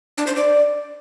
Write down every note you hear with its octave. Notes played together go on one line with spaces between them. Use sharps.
D4
C5
D5